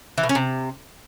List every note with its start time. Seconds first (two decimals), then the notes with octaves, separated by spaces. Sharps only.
0.18 E3
0.23 B2
0.29 C#4
0.35 C3